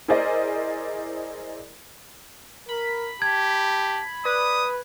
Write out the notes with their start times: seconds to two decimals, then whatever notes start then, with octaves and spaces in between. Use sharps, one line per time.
0.08 E4 G#4 A#4 C5 D5 D#5
2.69 A#4 B5
3.22 G4 A5 G#6
4.25 B4 D5 D#6